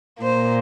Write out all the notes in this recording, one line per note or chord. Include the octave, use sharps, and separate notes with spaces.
A#2 A#3 C5